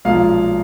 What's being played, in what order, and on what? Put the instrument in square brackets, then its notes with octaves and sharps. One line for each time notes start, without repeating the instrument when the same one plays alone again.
[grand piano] B1 A#2 F3 G#3 F5